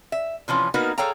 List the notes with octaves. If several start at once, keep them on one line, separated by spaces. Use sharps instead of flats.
E5
C3 E3 F3 C#4
A#3 B3 D#4 F#4 A#4 B4
G#4 A4 C#5 F5 G5 A#5